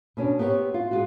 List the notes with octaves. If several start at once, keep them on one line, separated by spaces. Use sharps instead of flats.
B2 C#4 D4
B3 C4 G4 A4 C#5
F4
G#3 F4 F#4